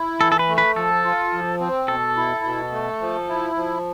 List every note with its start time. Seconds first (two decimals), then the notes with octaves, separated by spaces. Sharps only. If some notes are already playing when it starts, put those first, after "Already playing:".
Already playing: E4
0.20 E3 A4
0.32 A4
0.39 B4
0.49 A3
0.58 B4
0.76 F3 A4
1.05 F4
1.33 F3
1.60 C4
1.88 B2 A4
2.17 E4
2.45 B2
2.72 A3
3.01 F3
3.28 E4
3.56 F3